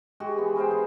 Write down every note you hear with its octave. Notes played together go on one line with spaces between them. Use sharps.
G#3 F#4 G4
E3 B3
G#4 A#4 C5 G5
E3